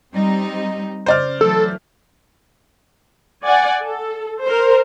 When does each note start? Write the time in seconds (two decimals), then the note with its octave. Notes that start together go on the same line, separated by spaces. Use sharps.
0.13 G3 C4 D#4
1.06 C#3 C5 D5 F6
1.41 E3 F#3 A3 A4
3.44 D5 F#5 G#5
3.83 A4
4.45 A#4 C5